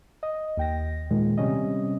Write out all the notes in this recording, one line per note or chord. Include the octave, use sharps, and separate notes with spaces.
D#5
D#2 G5 A#6
A#2 D#3 G#3
C3 G3 C#4 D#5